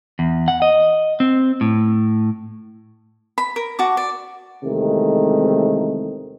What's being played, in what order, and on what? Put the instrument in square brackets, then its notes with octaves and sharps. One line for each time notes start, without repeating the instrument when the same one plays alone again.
[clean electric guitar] E2
F#5
D#5
C4
A2
[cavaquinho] B5
A#4
F#4 A5 D6
D5
[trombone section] E2 C3 D#3 G#3 A3